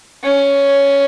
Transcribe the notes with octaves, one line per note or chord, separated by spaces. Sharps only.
C#4